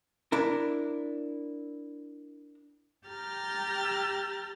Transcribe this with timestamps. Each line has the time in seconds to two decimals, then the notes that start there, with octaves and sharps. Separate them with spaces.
0.32 D4 E4 A#4
3.06 G4 A#5 F6 G6 A6